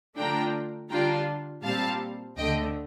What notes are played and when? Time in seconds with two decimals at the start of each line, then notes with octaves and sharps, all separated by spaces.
0.16 D3 A3 D4 F4 G5 A#5
0.90 D3 G3 D4 F4 G5 A#5
1.63 A#2 G3 C4 F5 A5
2.36 D2 D3 A3 D#5 G5